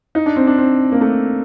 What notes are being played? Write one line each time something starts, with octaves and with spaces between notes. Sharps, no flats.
D#4
D4
C4
D4
C4
A#3
A3